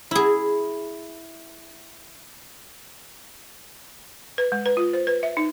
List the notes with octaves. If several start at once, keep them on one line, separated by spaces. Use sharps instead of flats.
E4 G#4
B4
G#3
B4
F4
C5
B4
E5
D#4